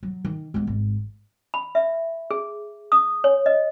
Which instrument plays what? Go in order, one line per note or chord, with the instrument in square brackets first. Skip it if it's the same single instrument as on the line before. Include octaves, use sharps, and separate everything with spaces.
[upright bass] F#3
D#3
G#3 B3
G#1
[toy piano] B5
E5
G#4
D#6
C#5
D#5